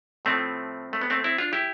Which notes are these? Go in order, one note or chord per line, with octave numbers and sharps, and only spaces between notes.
A2 F3 A3 C4
A3
B3
A3 C4
C4 E4
D4 F4
E4 G4